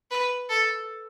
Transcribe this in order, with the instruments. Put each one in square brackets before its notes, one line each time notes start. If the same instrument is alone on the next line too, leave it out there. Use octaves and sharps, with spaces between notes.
[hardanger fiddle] B4
A4